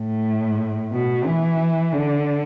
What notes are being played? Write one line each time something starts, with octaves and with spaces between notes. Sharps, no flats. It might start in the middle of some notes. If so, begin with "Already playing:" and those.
Already playing: A2
B2
E3
D3